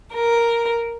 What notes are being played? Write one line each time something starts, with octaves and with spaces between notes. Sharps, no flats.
A#4